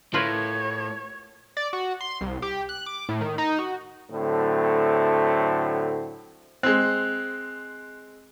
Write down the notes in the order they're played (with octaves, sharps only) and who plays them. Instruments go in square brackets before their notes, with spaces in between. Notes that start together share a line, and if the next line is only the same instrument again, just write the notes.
[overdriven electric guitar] A2 [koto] F4 A#4 B4 [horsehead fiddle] C#5
[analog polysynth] D5
F#4
C6
C2
G4
F#6
D6
A2
D#3
D#4
F#4
[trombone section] A2 D3 F#3 A3 C4
[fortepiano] G#3 C4 [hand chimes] F#6